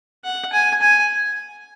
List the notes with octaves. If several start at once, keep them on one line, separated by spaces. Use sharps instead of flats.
F#5
G#5
G#5